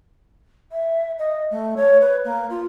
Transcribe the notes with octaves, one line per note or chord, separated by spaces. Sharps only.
E5
D#5
A3
C#5
B4
A#3
F4